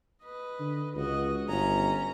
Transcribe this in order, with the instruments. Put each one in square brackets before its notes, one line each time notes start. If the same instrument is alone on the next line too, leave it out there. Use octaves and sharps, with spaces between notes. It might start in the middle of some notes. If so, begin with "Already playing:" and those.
[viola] B4 D#5
[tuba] D3
[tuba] C#2 [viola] F#4 D#5
[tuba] G1 [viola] C#4 A#5